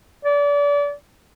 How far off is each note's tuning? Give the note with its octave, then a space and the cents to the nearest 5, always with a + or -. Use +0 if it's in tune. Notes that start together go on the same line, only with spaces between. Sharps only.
D5 -30